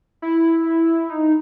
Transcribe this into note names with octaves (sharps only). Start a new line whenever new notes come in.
E4
D#4